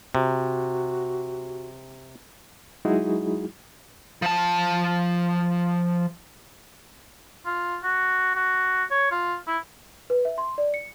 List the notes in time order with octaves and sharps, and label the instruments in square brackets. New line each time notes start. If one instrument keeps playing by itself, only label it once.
[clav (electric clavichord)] C3 [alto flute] F#4
[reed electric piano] F#3 G#3 D#4 E4 F#4 G#4
[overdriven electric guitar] F3 A5
[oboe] F4
F#4
F#4
C#5
F4
E4
[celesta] B4
E5
C6
D5
C#7